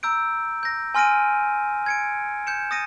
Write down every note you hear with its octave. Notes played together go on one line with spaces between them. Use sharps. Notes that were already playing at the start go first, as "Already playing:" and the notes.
A#5 E6 G6 D7
G6 A#6
G#5 C6 F6 A#6 D7 D#7
G#6 C#7 D7
G6 C#7 E7
D#6 A6 A#6 C#7 D#7